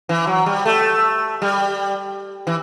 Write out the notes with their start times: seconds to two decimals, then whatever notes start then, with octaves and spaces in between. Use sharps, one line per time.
0.09 E3
0.27 F#3
0.46 G3
0.66 A3
1.42 G3
2.47 E3